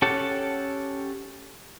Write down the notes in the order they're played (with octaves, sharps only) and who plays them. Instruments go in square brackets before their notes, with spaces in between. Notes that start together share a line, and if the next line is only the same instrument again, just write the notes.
[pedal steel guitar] C#4 G4 A4 F#5 A5